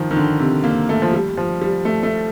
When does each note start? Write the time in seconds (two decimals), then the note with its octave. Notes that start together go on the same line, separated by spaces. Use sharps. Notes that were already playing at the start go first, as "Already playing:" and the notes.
Already playing: D#3 F3
0.11 D#3
0.16 D3
0.40 C3
0.64 A#3
0.89 A3
1.02 F3
1.13 G3
1.37 F3
1.62 G3
1.85 A3
2.03 A3